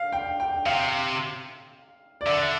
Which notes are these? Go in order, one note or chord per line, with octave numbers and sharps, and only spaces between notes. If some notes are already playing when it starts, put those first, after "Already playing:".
Already playing: F5
G5
G5
C3 F5
D5
D3 E5